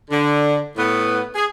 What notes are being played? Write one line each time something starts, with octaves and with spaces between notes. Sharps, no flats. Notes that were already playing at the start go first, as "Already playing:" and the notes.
D3
A2 B3
G#4